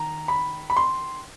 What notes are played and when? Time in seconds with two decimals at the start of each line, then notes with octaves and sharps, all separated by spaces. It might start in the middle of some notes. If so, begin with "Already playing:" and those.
Already playing: D#3 A#5
0.28 B5
0.70 B5
0.77 C6